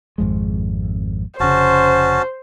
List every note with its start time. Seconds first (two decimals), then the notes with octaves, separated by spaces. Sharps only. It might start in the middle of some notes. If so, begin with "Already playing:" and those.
0.18 G#1 F2 G#3
1.40 F1 C#3 C#4 F#4 C5 A5